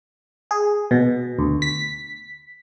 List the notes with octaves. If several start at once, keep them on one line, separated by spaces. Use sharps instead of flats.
G#4
B2
D2
B6